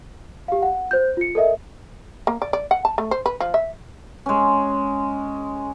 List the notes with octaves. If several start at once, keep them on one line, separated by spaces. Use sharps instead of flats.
G4 F5
F#5
C5 G6
F4 C#7
A4 A#4 D#5 E5
A#3
D5
D5
F#5
A5
A3
C5
B4
F3
E5
G#3 C#4